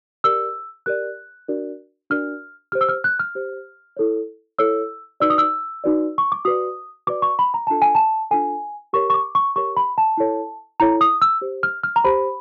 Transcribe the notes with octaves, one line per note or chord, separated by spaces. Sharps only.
G4 A#4 D5 E6
G4 A#4 D5 F#6
D4 F#4 A#4 D5
D4 F#4 A#4 D5 F6
G4 C5 F6
E6
F6
F#6
F6
G4 C5
E4 A4 C#5
E4 A4 C#5 E6
D#4 F#4 B4 D5 E6
D#6
E6
D#4 F#4 B4 D5
C#6
D6
F#4 B4 D5 D#6
F#4 B4 D5 D6
C#6
B5
A#5
D4 F4 A4 A5
G#5
A5
D4 F4 A4 G#5
G4 A#4 C#5 C#6
C#6
D6
C#6
G4 A#4 C#5 C#6
B5
A5
E4 A4 C#5
E4 A4 C#5 A#5
D#6
E6
G4 C5
F6
F6
A#5
G4 C5 B5